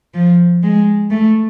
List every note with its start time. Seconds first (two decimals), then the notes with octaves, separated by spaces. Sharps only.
0.14 F3
0.63 G#3
1.10 A3